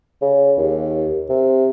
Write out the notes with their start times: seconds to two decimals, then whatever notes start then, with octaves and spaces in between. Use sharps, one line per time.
0.22 C#3
0.58 D#2
1.30 C3